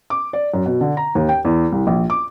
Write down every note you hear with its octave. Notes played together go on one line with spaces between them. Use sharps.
D6
D5
F#2
B2
D3
A#5
D#2
G5
E2
C2
A#1
D6